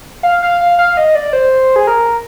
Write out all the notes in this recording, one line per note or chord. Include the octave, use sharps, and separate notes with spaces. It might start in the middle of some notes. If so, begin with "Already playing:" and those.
F5
F5
F5
F5
D#5
D5
C5
G#4
A#4